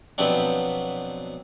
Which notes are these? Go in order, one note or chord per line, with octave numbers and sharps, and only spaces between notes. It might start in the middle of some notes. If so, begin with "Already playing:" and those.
B2 F3 F#3 B3 C4 D4